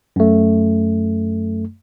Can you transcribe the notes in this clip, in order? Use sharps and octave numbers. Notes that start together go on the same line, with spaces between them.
F#2 A3